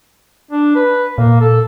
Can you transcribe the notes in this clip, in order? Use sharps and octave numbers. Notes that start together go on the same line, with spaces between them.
D4
B4
A#2 A#3
A4